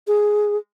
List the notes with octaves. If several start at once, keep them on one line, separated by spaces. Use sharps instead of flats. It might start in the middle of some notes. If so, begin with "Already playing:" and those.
G#4